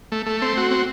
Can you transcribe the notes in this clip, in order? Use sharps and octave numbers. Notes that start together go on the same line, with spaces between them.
A3
A3
C4
F#4
C4